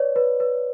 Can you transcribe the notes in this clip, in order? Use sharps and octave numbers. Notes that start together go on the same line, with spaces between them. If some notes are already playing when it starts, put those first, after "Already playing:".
Already playing: B4 C#5 D5
B4
B4